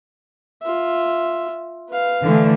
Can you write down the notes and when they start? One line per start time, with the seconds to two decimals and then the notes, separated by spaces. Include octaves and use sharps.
0.62 F4 E5
1.90 B4 F5
2.23 D3 E3 A3